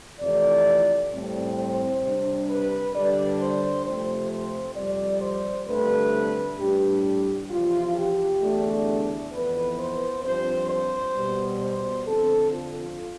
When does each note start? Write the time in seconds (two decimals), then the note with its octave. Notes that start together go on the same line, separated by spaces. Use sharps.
0.20 F2 C3 E3 A3 D5
1.12 A2 G3 C4
1.57 C5
2.03 C3 G3 D4
2.49 B4
2.94 D3 G3 D4 D5
3.40 C5
3.85 C3 F3 A3 C4 C5
4.30 C5
4.76 F2 C3 G3 D5
5.21 C5
5.67 G2 D3 A3 C4 B4
6.59 A2 G3 D4 G4
7.50 E2 C3 F3 F4
7.96 G4
8.41 E2 D3 A3 D4
9.32 F2 E3 B3 B4
9.78 C5
10.23 G2 F3 C4 C5
10.69 C5
11.15 B2 G3 B3
11.60 C5
12.06 D3 F3 C4 A4
12.52 F4